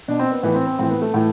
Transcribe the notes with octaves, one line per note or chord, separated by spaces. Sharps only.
B2 D4
C4
B3
A2 E3 B3
C4
C4
A2 E3 C4
B3
A3
A2 E3